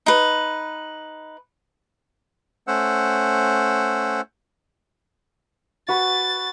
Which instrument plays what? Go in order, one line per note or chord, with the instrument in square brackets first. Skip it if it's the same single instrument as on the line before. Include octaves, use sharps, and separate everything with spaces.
[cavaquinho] D#4 B4
[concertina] A3 C#4 C5 F#5 E6
[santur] F#4 B4 [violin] A6